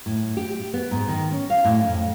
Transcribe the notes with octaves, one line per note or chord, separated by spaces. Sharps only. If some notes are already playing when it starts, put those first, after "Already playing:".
A2
G4
B3
G#2
D#3
C#4
F5
A2
F2